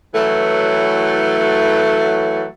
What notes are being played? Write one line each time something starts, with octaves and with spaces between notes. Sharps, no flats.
E3 F#3 A3